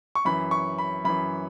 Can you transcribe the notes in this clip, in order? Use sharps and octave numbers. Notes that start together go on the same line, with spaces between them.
C#6
F#2 E3 B5
C#6
B5
F#2 E3 B5